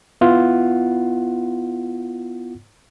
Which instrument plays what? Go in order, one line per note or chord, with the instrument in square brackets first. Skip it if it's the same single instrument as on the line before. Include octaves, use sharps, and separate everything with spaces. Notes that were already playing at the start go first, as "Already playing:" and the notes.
[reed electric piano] B3 E4 F4 F#5